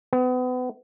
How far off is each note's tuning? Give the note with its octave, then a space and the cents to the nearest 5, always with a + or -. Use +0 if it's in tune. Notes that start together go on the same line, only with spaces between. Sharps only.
B3 +35